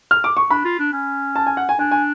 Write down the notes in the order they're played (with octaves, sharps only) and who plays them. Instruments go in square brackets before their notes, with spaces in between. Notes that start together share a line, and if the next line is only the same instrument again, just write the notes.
[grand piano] F6
D6
C#6
[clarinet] D4 [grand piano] B5
[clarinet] F4
D4
C#4
[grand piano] A5
G#5
F#5
G#5
[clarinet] D4 [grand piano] G#5
[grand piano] G#5